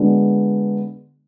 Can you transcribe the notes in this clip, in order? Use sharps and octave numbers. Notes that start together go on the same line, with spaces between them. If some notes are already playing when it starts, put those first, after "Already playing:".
Already playing: D3 G#3 B3 D4 F#4